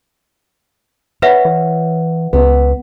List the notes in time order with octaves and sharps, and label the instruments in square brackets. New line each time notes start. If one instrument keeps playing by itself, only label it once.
[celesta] B4 E5 F#5 [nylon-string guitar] C#5
[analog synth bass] E3
[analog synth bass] C#2 [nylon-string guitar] B3